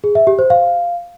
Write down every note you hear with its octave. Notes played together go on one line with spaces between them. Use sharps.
G#4
E5
G4
C5
F5